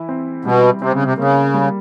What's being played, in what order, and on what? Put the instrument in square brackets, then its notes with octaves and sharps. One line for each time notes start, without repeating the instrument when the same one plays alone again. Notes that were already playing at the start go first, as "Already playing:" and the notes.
Already playing: [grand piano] E3 E4
C4
[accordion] B2 [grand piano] G3
[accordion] C3 [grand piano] C4
[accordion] C#3
C3
[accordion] C#3 [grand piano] A#3
[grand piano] G3